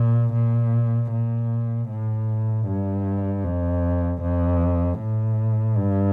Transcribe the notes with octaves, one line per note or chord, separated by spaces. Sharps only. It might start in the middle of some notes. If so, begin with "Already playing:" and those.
Already playing: A#2
A#2
A#2
A2
G2
F2
F2
A2
G2